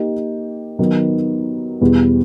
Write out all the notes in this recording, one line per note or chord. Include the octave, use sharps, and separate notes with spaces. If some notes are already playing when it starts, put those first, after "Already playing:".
Already playing: A#3 D#4 G4
D#3 F#3 B3 D#4
E2 B2 G3 B3